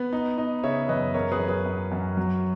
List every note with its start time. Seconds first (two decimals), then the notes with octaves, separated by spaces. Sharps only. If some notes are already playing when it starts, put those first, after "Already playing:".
Already playing: B3 B4
0.13 D#4
0.38 D#4
0.63 C#3 C#5 E5
0.89 F#2 B4 D#5
1.14 F#2 A#4 C#5
1.32 G#4 B4
1.40 F#2
1.48 G#4 B4
1.66 F#2
1.92 F#2
2.17 F#3